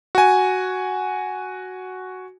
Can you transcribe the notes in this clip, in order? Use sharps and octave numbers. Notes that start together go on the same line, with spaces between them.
F#4 G#5